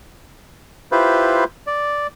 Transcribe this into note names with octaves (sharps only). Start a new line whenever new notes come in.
E4 F4 G4 B4 C5
D5